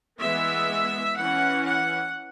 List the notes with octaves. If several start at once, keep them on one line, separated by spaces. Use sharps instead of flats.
E3 G#3 B3 E5
E3 C#4 F#5
F#5